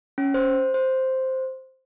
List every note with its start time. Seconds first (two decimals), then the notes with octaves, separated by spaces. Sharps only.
0.18 C#4
0.34 C5
0.74 C5